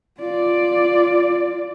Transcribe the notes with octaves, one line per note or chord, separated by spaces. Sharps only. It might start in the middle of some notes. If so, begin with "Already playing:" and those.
F4 D5